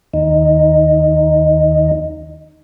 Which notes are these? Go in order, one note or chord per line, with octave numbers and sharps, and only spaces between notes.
D#2 D#4